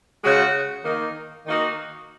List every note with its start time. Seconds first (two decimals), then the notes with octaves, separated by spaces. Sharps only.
0.22 C#3 G#3 F#4
0.84 D#3 A#3 D#4
1.46 D#3 A#3 D#4 F#4